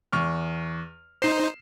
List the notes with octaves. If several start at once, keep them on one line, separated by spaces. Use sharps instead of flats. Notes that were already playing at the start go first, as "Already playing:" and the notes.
E2 C#6 F6
D#4 C5 C7 E7